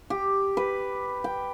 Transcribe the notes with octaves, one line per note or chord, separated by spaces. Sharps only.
G4
B4
G5